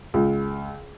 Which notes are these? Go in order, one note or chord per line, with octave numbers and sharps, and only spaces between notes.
C#2